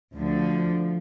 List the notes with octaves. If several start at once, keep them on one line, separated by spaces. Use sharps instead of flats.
D2 D3 F3